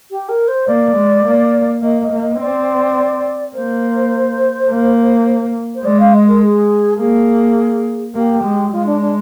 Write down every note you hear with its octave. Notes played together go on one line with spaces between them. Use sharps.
G4
A#4
C5
A#3 D5
G#3
A#3
A#3 D#5
D#5
A#3
D#5
C4 D5
A#3 C5
A#3
C5
G#3 D5
F5
D#5
A#4
G#4
A#3 G#4
A#3 G4
G#3
G#3 F4
D4
D4